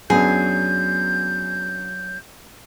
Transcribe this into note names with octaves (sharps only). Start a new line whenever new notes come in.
F#2 F#3 B3 D4 G#4 G6